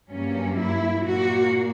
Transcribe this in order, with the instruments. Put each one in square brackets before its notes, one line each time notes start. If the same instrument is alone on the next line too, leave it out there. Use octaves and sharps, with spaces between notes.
[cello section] G2 F#3 A#3 C#4
E4
A#2 A#3 F#4